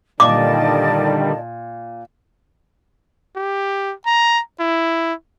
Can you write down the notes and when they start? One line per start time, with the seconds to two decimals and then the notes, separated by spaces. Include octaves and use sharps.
0.20 A#2 D3 D#3 G3 D5 D#5 A5 D6
3.36 G4
4.06 A#5
4.60 E4